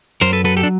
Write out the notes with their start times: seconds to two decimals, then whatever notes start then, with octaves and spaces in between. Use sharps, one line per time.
0.21 F#2 A#4 C5
0.33 A4 B4
0.44 F#3 A4 B4
0.57 G4 A4
0.63 D4